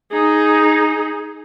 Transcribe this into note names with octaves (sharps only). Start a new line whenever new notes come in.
D#4 G#4